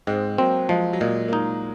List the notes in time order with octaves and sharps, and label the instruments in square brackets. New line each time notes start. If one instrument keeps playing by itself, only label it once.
[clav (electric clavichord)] G#2 [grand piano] G#3 C4
[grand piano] F#3 A#3 [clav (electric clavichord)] C4
[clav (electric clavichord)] F3 [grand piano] G#3
[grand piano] F#3
[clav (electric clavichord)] A#2 [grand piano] G#3
[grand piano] A#3
[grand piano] G#3 [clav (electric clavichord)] D#4